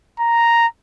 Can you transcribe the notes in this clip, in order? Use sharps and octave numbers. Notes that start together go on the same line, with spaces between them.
A#5